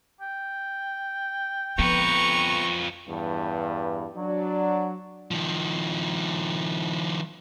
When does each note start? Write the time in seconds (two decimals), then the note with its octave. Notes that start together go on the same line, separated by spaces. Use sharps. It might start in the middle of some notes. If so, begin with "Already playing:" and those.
0.21 G5
1.79 F2 F3 B3 B4 A#5 C#6
3.08 E2 G2
4.16 F#3 D4 D5
5.31 D#3 F3